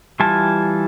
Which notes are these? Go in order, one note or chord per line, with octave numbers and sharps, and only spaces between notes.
E3 G3 F4 G#5 A5